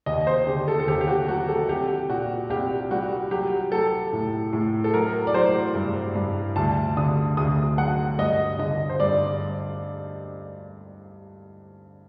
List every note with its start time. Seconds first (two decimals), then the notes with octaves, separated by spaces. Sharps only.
0.06 D#2 D#5
0.27 C5
0.47 D3 G4
0.68 A4
0.80 A4
0.88 D#2 G4
1.01 G4
1.08 F#4
1.28 F#3 F#4
1.48 A4
1.69 C2 G4
2.09 A#2 F#4
2.50 C2 G4
2.90 G3 F#4
3.31 F#3 G4
3.72 F#3 A4
4.13 A2
4.53 A2
4.84 A4
4.94 F#3 A#4
5.27 D5
5.34 F#3 C5
5.75 G2
6.16 G2
6.56 D2 A5
6.97 D3 D#6
7.37 D2 D#6
7.78 F#3 F#5
8.18 G2 D#5
8.59 D3 D#5
8.89 C5
9.00 G2 D5